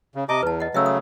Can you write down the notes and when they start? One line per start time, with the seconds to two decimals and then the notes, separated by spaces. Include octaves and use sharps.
0.15 C#3
0.29 C3 D#5 A5 A#5 D6
0.43 E2 B4 A5
0.60 D#5 F#5
0.74 C#3 F#3 A3 E5 G5 E6
0.86 D#6